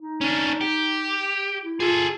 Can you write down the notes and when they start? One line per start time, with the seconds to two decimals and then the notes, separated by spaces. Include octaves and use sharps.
0.01 D#4
0.21 C#4 D4
0.61 G4
1.64 E4
1.80 F4 G#4 A4